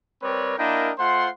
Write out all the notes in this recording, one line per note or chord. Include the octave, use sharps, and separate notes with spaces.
G3 C4 A#4 B4 C#5 D5
A#3 D4 E4 A#4 D#5 G5
A3 F4 C5 F#5 C6